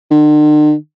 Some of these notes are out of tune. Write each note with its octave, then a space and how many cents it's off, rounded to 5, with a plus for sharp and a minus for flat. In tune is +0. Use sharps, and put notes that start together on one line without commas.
D3 +45